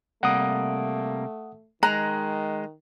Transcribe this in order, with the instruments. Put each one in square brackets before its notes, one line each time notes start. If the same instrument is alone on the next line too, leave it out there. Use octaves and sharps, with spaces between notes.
[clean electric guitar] C3 G3 A#3 [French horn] A3 [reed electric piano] F#5 D#6
[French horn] D#3 [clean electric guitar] G#3 [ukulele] A#5 [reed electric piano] F#6